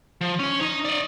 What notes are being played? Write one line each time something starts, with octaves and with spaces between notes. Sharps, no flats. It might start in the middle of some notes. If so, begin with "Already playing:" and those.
F3
C#4 C#5
D#4
D5 D#5